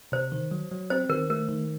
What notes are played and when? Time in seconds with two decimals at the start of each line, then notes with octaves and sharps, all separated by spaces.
0.12 C3 C5
0.32 D#3
0.51 F#3
0.72 F#3
0.90 C4 C5
1.10 D#3 A#4
1.30 A3 A#4
1.49 D#3